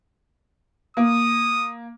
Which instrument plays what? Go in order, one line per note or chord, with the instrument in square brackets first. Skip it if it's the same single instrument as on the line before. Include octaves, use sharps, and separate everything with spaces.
[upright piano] A#3 [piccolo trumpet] D#6